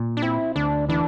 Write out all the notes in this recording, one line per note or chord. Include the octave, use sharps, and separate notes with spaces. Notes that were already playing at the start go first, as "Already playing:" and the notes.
Already playing: A#2
D4
C4 E4
D2 D4
E3 D4